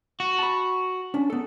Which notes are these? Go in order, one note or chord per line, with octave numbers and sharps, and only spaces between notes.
F#4
A5 B5
C#4 D4
B3 A4